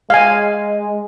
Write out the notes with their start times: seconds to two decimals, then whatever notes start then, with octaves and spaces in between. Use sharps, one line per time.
0.10 G#3 F5 G#5